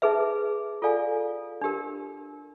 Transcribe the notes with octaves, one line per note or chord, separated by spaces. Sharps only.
D#4 G#4 B4 E5
F4 A4 D5 F5 G#5
D4 G4 A#4